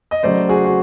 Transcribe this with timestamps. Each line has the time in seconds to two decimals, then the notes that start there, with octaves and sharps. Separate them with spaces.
0.11 D#5
0.23 C#3 F#3 A3 C5 D5
0.49 F#4 G#4
0.65 F#4